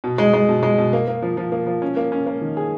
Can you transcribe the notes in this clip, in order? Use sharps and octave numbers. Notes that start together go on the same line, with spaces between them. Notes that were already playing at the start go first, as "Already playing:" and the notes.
B2
G#3
G#3
B2
G#3
B2
A#3
A#3
F3
F3
A#3
F3
C#4
A#3
C#4
A#3
D#3
G#4